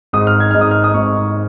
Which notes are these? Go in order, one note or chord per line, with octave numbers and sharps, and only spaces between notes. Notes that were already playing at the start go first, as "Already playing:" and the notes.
G#1 G#2 G#3 D#6
F6
G#6
G#1 G#2 G#3 F6
D#6
F6
D#6
G#1 G#2 G#3 C#6